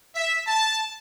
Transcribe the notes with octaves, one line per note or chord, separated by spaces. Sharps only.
E5
A5